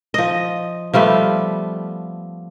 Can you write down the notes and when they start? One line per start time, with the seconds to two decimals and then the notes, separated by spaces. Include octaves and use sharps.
0.14 F3 D#5
0.94 F3 G3 A3 B3